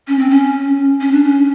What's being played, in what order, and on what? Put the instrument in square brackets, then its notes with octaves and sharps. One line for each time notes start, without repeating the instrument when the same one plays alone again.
[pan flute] C#4
C4
C#4
C#4
D4
C#4